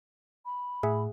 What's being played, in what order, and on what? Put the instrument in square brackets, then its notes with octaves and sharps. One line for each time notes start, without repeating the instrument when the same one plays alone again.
[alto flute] B5
[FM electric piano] A2 [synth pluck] G#4 E5 F#5